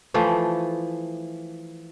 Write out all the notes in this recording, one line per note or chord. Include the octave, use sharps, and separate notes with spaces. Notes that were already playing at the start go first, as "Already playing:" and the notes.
E3 F3 A3